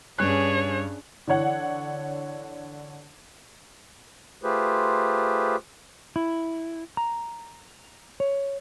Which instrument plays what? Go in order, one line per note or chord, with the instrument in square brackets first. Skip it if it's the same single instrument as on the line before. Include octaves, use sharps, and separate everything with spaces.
[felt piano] G2 F#6 [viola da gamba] C#4 D4 G#4 [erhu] C#5
[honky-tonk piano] D3 E3 C#5 F#5
[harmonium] A3 F4 G4 G#4 B4 C5
[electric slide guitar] E4
A#5
C#5